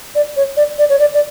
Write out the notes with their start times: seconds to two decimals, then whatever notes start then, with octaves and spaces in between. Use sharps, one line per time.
0.15 D5
0.37 C#5
0.57 D5
0.79 D5
0.89 C#5
0.99 D5
1.14 D5